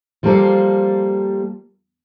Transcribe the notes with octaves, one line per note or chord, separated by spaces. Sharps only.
F3 G3 A#3 A4 C5